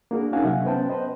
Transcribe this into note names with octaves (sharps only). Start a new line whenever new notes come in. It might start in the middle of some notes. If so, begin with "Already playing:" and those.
A#3 D4 F#4 G#4 A#4
C#4 D#4 F#4 F5 G#5
C3 F#3 E5 F#5
B3 C#4 B4 C5 G5 A5
B4 C5 D#5